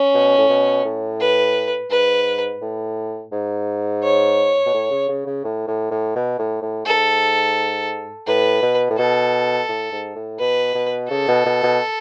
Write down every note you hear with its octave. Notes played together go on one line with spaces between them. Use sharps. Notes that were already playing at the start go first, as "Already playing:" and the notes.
Already playing: C#4
B2
A2
B2
A2
B4
G#2 B4
A2
G#2
C#5
B2
A2
C#3
C#3
C#3
A2
A2
A2
B2
A2
A2
G#2 A4
A2 B4
B2
A2
B2 A4
A2
G#2
A2
B2 B4
B2
C#3 A4
B2
B2
B2